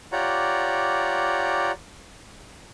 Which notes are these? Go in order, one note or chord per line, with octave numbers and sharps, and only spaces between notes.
F4 G4 C#5 D5 F#5 A#5